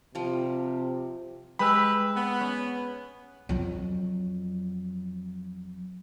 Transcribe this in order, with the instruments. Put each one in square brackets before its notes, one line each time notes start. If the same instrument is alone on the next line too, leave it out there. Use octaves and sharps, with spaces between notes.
[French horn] C3 [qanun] F3 G3
[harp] G#3 E6 [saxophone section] G4 B4 [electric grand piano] B5
[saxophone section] B3
[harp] C#4
[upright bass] F2 F#3